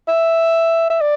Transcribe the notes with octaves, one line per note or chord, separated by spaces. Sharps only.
E5
E5
D5